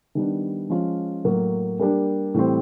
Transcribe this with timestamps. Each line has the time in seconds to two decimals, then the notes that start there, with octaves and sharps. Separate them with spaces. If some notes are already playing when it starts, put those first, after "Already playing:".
0.15 D#3 G3 B3 D4
0.70 F3 G#3 C#4 F4
1.25 A2 F#3 A#3
1.79 G3 A#3 D4 G4
2.34 A2 E3 G3 C4